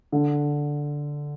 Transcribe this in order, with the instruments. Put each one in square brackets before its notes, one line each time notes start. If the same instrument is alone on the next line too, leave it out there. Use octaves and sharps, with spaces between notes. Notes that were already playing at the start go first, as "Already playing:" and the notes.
[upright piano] D3